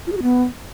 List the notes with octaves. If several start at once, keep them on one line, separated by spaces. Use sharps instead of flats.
F4
G#4
F#4
B3